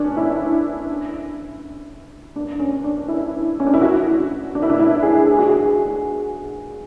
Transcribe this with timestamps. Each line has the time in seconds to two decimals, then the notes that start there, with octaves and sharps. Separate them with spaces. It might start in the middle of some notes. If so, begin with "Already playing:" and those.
Already playing: C#4 D4
0.17 E4
2.36 D4
2.55 D4
2.60 C#4
2.84 D4
3.08 E4
3.60 C#4
3.67 D4
3.74 E4
3.82 F#4
4.55 D4
4.62 E4
4.70 D4
4.80 E4
5.03 G#4
5.27 G#4
5.39 F#4
5.50 G#4